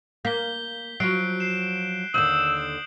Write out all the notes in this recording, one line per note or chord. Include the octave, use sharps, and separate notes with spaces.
A#3 G6 B6 G7
F3 F#3 F#6 C7 D7
C7 E7
D#2 D3 D#6 E6 G6 F#7